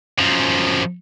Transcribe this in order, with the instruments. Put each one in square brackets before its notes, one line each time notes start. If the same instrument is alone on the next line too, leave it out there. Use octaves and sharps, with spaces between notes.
[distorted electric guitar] F#2 F3